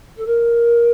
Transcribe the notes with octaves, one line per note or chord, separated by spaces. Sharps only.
A4
A#4